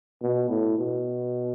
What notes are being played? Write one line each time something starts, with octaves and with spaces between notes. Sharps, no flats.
B2
A2
B2